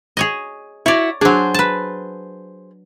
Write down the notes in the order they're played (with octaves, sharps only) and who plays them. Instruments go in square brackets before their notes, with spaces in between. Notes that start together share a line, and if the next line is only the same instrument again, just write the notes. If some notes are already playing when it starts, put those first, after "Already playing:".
[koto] G#4 C#5 D#5
[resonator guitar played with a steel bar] E4 F#4 [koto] C#5 D5
[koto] F#3 D4 [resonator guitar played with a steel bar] G#4 C5
[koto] B4 A5